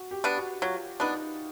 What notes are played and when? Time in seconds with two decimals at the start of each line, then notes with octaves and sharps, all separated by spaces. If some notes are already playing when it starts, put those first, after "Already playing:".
Already playing: F#4
0.11 G4
0.24 B3 D4
0.37 F#4
0.62 F#3 F4
1.00 B3 D4 D#4